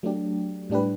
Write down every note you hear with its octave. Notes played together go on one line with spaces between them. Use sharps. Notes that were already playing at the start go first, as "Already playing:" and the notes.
F#3 A3 D4 G4
A2 G3 D4 G4 B4